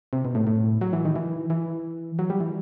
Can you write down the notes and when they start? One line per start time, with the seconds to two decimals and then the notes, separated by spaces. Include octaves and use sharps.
0.13 C3
0.25 B2
0.35 A2
0.47 A2
0.81 F#3
0.93 E3
1.05 D#3
1.16 E3
1.50 E3
2.19 F#3
2.30 G3
2.40 E3